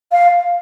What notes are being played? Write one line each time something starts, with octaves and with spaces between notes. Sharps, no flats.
F5